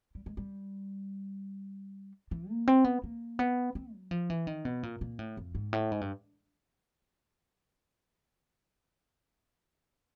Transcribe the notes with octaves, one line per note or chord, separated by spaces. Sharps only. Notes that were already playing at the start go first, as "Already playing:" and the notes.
G3
G#3
G3
E3
A#3
C4
B3
A#3
B3
C4
F#3
F3
E3
D#3
B2
A#2
A#2
A2
F2
G#2
A2
G#2
G2